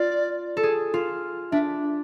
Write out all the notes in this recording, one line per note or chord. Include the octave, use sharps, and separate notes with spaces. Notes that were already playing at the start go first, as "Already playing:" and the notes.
Already playing: F4 D5
A4
G#4
F4
D4 E5